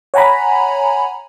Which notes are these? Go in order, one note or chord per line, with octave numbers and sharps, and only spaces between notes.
C#5 F#5 G#5 A#5 B5